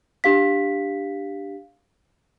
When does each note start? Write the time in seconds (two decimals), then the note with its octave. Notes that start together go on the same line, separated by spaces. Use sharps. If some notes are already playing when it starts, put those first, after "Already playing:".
0.24 D4 G4 F5 B6